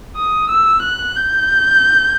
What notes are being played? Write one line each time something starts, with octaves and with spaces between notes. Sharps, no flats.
D#6
E6
F#6
G6